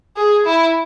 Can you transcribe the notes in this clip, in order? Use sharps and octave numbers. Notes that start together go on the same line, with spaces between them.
G#4
E4